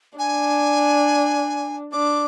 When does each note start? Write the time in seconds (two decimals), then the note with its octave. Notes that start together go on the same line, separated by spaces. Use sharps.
0.18 D4 G#5
1.93 D4 D6